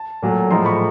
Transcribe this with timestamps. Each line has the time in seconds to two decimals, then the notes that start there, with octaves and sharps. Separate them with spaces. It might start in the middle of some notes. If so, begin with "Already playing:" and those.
Already playing: A5
0.22 A#2 F#3 A3
0.51 A2 F3 G#3 A#5 C6
0.65 B5 C#6